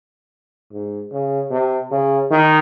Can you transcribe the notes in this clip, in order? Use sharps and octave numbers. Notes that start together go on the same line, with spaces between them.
G#2
C#3
C3
C#3
D#3